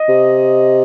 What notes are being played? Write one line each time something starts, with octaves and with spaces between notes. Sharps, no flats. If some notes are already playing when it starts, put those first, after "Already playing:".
Already playing: D#5
C3